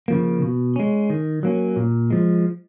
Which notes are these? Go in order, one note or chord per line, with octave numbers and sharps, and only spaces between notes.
C#3 F3 A#3
B2
G#3 C#4
D#3
F#3 A#3 C#4
A#2
F3 G#3